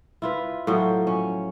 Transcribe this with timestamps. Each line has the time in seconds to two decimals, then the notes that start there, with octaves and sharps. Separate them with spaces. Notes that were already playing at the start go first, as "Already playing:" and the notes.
0.22 E4 F4 B4
0.67 A2 F3 F#3
1.07 C#4